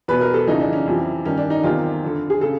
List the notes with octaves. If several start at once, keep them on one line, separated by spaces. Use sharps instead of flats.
E2 B2 B4
A#4
A4
F2 C#3 E3 D#4
D4
C#4
F2 C3 E3
G2 D#3 C#4
D4
D#4
E2 C3 D#3 F4
F2 D3
G#4
C#3 A4